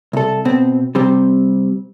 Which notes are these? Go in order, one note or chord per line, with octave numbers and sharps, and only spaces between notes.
C2 A4
B2 C4
C3 G3 C4